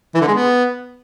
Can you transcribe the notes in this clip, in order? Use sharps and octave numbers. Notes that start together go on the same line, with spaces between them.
E3
D3
G#3
B3